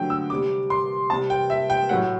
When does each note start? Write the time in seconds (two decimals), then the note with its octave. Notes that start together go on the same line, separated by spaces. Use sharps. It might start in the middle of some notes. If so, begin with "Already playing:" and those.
Already playing: D3 F#3 A3 G5
0.10 E6
0.30 C3 G3 D6
0.70 C6
1.10 C3 G3 A5
1.30 G5
1.50 E5
1.70 G5
1.89 A2 F#3 A3 F#5